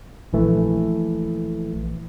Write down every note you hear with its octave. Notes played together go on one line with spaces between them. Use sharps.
A#1 E3 A3